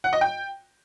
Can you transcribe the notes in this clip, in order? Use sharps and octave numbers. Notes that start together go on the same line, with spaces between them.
F#5
D#5
G5